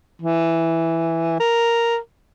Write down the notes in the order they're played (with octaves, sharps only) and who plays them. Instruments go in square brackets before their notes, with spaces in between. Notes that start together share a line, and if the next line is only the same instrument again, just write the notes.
[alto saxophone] E3
A#4